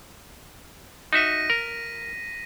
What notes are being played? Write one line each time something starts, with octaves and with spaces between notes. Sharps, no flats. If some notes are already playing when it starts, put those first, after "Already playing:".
D#4 F#4 E5 A#6 B6 D#7
A#4